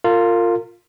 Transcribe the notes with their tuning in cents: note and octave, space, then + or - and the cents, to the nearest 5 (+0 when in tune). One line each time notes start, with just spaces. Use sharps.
F4 +0 A#4 -35